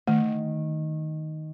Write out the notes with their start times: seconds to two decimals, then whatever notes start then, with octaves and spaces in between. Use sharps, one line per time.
0.08 D#3 A3